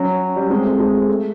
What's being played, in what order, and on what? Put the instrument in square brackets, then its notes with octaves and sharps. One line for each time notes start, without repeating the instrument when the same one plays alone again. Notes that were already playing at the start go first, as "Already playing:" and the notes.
Already playing: [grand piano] F#3 [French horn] C#4
[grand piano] G3
[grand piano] G#3 [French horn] C4
[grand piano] A3
G#3
A3